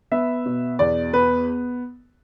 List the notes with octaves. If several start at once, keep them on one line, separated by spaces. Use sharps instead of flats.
B3 E5
B2
E2 D5
B3 B4